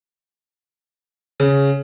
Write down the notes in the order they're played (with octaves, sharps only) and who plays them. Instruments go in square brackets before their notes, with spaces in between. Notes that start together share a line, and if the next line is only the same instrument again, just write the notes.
[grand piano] C#3